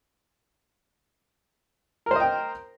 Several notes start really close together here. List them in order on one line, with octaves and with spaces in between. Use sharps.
A#4 C5 D#5 G5